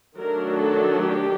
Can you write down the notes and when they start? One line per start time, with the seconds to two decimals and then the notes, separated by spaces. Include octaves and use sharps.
0.17 D#3 F#3 A3 D4 A#4
0.61 A4
1.05 G4